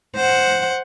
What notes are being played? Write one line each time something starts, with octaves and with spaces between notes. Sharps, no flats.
C5 F#5